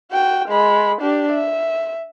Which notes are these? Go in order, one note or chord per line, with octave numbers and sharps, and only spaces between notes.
F#4 G5
G#3 B5
D4 G4
E5